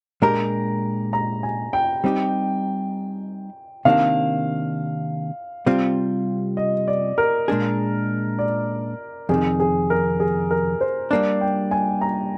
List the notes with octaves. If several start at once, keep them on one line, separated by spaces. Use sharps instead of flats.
A#2 G#3 D4 G4 A#4 A#5
A#5
G#5
G5
G3 C4 D#4 G4
C3 D#3 A#3 D4 F5
C3 G3 C4 F4
D#5
D5
A#4
A#2 G#3 D4 G#4
D5
F2 C3 D#3 G#4
G#4
A#4
G#4
A#4
C5
G3 A#3 D4 D5
G5
G#5
A#5